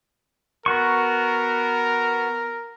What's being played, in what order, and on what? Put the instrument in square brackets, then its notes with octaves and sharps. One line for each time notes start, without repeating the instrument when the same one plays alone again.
[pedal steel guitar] B3 F#4 C#6 [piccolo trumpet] A#4